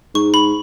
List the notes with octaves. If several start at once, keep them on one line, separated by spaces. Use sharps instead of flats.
G#2 C#6
B5